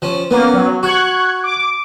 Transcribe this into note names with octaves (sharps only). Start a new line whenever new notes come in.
F3 C#4
A#3 B3 C#4
F#3
F#4 C#6 F#6 G#6
D6